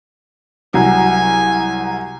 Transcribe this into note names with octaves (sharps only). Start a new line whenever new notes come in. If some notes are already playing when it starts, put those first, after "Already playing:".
C2 F#3 G#5